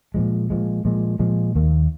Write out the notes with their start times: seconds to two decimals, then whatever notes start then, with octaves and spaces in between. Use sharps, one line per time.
0.14 A#2 F3 G#3
0.50 A#2 F3 G#3
0.85 A#2 F3 G#3
1.19 A#2 F3 G#3
1.55 D#2 D#3 A#3